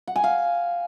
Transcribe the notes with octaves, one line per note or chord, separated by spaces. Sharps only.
F#5
G#5
F5